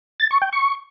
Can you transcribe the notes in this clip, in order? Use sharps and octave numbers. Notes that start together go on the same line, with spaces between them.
A6
C#6
G5
C#6